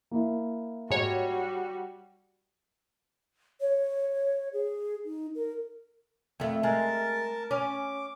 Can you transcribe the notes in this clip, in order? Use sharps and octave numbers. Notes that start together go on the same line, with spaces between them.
A#3 E4
G#2 G3 F#4 C#5
C#5
G#4
D#4
A#4
F2 A3
G#3 A#4 A5
C#4 D6